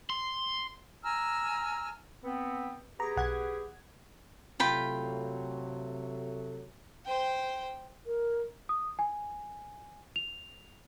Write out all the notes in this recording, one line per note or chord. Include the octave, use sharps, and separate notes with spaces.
C6
G#5 A#5 E6 F6
B3 C4
B3 G4 G#4 A#5
B1 F#5 G#6
C3 F#3 A3 F4 G5 B5
C5 G5
A#4
D#6
G#5
F7